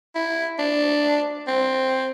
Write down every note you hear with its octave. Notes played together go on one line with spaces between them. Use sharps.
E4
D4
C4